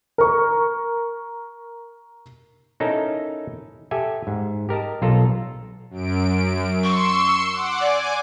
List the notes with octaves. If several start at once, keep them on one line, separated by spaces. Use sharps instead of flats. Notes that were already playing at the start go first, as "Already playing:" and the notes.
A#4 C#6
C#4 D#4 E4 A4 A#4
G4 A4 E5 G#5
G#2
G4 A#4 D#5 A5
B1 F4 A4 A#5
F#2 D7
C6 C#6 E6 C#7
F#5 D6
D5 G#5 D6